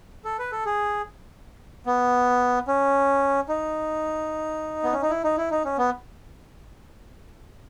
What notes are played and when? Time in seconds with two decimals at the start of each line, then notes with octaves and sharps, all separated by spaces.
0.25 A4
0.39 B4
0.52 A4
0.65 G#4
1.86 B3
2.67 C#4
3.49 D#4
4.83 B3
4.93 C#4
5.02 D#4
5.10 E4
5.24 D#4
5.37 E4
5.51 D#4
5.65 C#4
5.78 B3